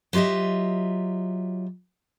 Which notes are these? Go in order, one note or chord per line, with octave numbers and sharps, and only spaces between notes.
F#3 F4 G4 D#5 E5